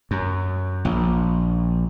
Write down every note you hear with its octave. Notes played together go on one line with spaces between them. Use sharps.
F#2
A#1